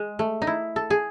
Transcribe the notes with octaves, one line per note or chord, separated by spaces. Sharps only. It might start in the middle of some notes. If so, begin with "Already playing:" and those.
Already playing: G#3
A3
D#4
E4
A4
G#4